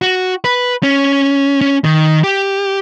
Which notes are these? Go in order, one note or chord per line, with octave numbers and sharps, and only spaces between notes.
F#4
B4
C#4
C#4
D#3
G4